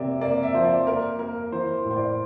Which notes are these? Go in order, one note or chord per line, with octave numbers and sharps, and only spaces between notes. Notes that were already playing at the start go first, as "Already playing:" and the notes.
Already playing: C3 A#3 D5 E5
A#3 D5
E5
F3 C5
D5
A#3 A#4
A#3 A#4
E3 C5
A2
C5
D5